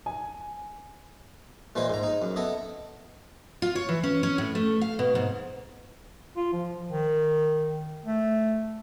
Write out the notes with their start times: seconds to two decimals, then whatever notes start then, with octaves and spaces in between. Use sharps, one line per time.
0.06 G#5
1.75 A#2 E3 G#3 B4 C5
1.90 G#2 A#5
2.03 D#4
2.22 F#2
2.36 B3 E4 A4 D#5
3.62 F4
3.75 C#5
3.89 E3
4.03 C#4
4.23 C#4
4.38 A2
4.55 A3
4.81 F5
4.99 B2
5.15 G#2
6.36 F4
6.53 F3
6.91 D#3
8.05 A3